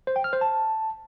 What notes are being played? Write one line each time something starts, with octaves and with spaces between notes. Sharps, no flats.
C5
G5
F6
C5
A5